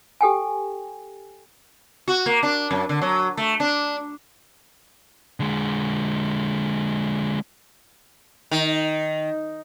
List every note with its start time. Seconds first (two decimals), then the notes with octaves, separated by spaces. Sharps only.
0.21 G4 A4 G5 G#5
2.08 F#4
2.26 A#3
2.43 D4
2.71 F#2
2.89 D3
3.02 F#3
3.37 A3
3.60 D4
5.40 D3 G#3
8.51 D#3